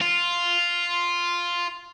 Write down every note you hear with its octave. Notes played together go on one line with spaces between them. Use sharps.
F4